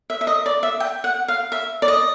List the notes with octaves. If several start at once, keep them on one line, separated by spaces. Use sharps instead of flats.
E5
E5
D#5
D5
E5
G5
F#5
F5
E5
D5
D#5